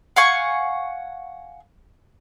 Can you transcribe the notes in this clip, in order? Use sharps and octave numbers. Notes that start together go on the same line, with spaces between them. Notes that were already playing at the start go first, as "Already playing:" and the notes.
F5 F#5 G#5 C#6